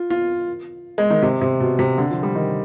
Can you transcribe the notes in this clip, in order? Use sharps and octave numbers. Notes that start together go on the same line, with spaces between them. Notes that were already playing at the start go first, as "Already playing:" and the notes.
Already playing: F4
F4
G#3
D#3
C3
C3
B2
C3
D3
F3
G3
D#3